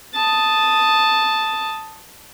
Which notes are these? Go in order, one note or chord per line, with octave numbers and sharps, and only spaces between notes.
A5 D#6